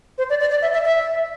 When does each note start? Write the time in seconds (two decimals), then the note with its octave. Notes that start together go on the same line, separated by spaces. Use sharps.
0.18 C5
0.30 D5
0.40 D5
0.51 D5
0.62 E5
0.73 E5
0.85 E5